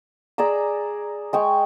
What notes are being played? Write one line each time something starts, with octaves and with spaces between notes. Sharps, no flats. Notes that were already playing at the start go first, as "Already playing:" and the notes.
G#4 D5 A#5 E6
G#3 G5 C#6